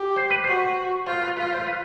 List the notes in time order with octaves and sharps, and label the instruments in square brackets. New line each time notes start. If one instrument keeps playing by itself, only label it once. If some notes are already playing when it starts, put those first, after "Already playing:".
Already playing: [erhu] G4
[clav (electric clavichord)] C5
B4
[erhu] F#4 [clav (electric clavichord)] C5
[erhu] F4 [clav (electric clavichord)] C5
[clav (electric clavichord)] B4
[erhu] F4 [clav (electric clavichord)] B4
[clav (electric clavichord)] C5
B4